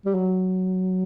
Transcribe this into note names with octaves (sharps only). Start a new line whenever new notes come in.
G3
F#3